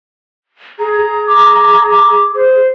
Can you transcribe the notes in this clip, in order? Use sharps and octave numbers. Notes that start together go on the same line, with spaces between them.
G#4 A#5
G#4
D6
C5